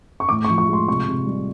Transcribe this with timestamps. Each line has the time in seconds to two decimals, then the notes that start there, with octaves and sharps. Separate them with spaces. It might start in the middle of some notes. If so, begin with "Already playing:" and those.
0.20 C#6
0.29 A2 D6
0.45 C#6
0.49 F3
0.58 C#6
0.68 G#3 C6
0.88 C3 C#6
1.08 C3
1.27 G3